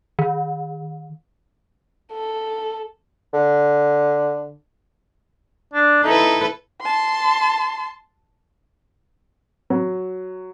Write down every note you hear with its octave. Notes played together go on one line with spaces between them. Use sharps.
D#3
A4
D3
D4
D#4 E4 A4 B4
A5 C6
F#3